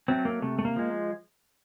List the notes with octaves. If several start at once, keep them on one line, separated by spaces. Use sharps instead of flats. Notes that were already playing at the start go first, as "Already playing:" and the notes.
F#3 A3 C4
A#3
C3 A3
A3
A#3
F3 G#3